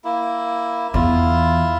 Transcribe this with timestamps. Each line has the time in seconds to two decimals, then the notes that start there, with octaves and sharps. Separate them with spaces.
0.04 A#3 E4
0.94 E2 E4 F4